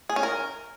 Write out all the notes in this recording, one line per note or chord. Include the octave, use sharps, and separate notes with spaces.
G#4
C#4
A#4